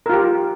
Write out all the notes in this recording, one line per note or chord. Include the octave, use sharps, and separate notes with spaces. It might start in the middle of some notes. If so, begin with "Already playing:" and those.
F4 G4 A#4